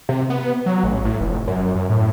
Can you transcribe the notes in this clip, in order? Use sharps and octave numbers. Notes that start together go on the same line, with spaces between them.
C3
B3
F#3
A1
A2
F1
F#2
F#2
A2